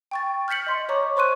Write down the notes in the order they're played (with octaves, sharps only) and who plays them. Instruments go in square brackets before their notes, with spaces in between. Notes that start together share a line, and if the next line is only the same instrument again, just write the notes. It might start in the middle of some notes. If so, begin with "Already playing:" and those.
[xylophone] G5 C#6 A6
F6 G6 A6 B6 C#7 F#7
D#5 C6
C#5 D#5 A#5 C#6 D6
C5 C6 C#6 F#6 D#7